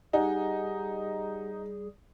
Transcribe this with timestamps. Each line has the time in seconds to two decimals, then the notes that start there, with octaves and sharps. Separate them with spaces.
0.13 G3 D#4 G4 G#4 F#5 G#5